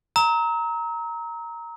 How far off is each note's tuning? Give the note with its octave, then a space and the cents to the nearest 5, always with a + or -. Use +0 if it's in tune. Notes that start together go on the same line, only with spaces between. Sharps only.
A#5 +0 E6 -45